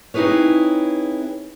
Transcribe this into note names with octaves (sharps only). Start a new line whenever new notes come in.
C4 D#4 E4 G#4 B4 C#5